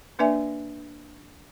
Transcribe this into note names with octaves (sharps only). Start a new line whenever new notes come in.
A#3 D4 B4 D5 E5 G#5